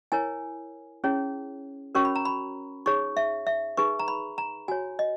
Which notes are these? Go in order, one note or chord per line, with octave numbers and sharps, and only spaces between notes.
E4 A#4 C#5 G#5
C#4 E4 G#4 C#5
C#4 F#4 A#4 C#5 C#6
B5
A#5
B5
D#4 G#4 C#5 C#6
E5
E5
D#4 G#4 B4 C#6
A#5
B5
A#5
F#4 C#5 G#5
D#5